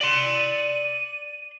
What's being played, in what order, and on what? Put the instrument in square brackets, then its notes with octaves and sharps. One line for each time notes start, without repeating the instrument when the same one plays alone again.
[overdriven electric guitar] D5 C6 [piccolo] D#7